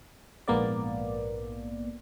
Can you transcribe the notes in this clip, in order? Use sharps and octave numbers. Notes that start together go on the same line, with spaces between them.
A#1 G#2 A#3 B3 D5